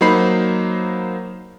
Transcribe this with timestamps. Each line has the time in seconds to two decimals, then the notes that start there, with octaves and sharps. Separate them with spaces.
0.01 F#3 A#3 D#4 C5 B5 C7